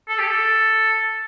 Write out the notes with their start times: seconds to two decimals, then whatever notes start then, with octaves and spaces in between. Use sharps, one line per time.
0.09 A4
0.19 G4
0.27 A4